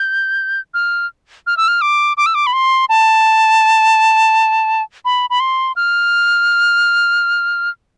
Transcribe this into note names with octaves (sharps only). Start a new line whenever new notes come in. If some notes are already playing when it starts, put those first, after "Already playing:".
Already playing: G6
F6
F6
E6
F6
D6
D6
E6
D6
B5
C6
A5
B5
B5
C6
F6